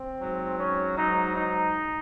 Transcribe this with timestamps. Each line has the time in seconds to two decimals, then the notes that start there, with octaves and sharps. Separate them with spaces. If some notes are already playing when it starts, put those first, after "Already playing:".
Already playing: C4
0.19 G#2 F#3
0.57 C#4
0.97 G#2 F#3 D#4
1.36 D#4